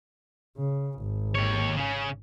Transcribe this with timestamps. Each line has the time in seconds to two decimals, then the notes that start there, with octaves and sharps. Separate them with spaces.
0.58 C#3
1.01 G#1
1.35 D#2 C#5
1.76 C#3 C#4